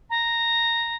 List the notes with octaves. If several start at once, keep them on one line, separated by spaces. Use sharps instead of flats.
A#5